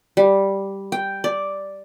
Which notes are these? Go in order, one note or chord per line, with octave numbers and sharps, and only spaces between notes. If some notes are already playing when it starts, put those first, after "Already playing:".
G3
G5
D5